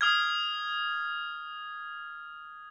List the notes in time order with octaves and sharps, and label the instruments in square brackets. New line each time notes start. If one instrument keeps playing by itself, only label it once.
[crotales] D#6 F6 G#6